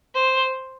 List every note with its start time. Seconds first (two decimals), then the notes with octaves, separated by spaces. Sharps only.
0.15 C5